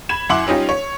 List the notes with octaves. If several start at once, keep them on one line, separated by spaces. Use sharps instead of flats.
B5 G#6 E7
F#2 E4 F#5 C6 D6 F#7
G3 C#4 D#4 F4 G4
C#5